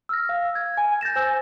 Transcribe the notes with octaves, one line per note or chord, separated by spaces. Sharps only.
E6 F6 A#6
F5
G#6
G#5
G6 A6 A#6 E7
C5 G#5 E6 G6